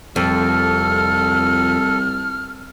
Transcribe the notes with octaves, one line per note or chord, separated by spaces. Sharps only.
C2 F2 A4 F6